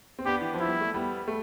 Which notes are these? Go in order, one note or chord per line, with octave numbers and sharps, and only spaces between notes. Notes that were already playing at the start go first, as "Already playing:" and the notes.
C4
B3 D4 G4
E3
F3
E4
G3
A3
G3 B3
A3